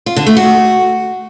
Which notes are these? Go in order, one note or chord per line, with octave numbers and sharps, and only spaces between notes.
F4
D3
A3
F#4